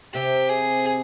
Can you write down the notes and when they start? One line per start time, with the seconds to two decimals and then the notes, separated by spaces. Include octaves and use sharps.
0.14 C3 G4
0.49 G#4